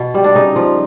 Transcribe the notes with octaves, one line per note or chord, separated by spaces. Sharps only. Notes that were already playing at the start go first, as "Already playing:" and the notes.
Already playing: B2
G3
D4
C#3 D#4
F3